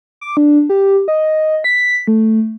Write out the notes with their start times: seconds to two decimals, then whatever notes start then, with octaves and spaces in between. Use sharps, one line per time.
0.21 D6
0.37 D4
0.69 G4
1.08 D#5
1.64 B6
2.07 A3